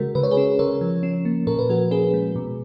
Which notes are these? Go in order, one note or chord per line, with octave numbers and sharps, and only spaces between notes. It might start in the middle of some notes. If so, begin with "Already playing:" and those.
Already playing: C#3 G#3 F#4 A#4
C#3 B4
C#5
G#4 B4
C#4
C#3 A#4 C#5
F3
C#4
A#3
A#2 A#4
B4
F3 F#4 A#4
C#4 G#4 B4
G#3
B2